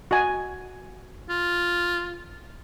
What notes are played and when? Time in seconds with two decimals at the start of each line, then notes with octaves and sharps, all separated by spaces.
0.11 F#4 D#5 G#5
1.30 F4